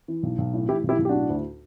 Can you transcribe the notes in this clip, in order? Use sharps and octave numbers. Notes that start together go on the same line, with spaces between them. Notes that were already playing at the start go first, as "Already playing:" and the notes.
E3
B1
B1
A2
E3 E4 G4
B1
E4 G4
B1
G4
A2 D4 F#4
D2